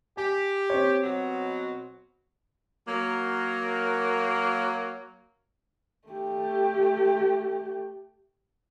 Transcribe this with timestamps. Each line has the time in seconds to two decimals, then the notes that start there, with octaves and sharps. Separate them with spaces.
0.17 G4 G#5
0.70 C4 C#5
1.04 B2 F#3
2.88 F#3 A#3
6.08 A3 G4